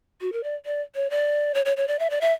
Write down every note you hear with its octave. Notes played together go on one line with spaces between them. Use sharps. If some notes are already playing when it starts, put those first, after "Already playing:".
F#4
A#4
D5
D5
C#5
D5
C#5
C#5
C#5
D5
E5
D5
E5